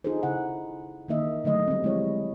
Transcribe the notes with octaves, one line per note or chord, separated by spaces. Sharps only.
D#4 F4 G#4 A4 C5
C#3 E4 F#5
D#3 E3 A#3 D#4 D#5 E5
D3 F#3 A3 D#5
G3 C4
F3 G#3 E4 C#5